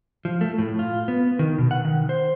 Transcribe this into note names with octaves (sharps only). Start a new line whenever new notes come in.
F3
A3
A2
F4
B3
D#3
B2
F#5
D#3
C5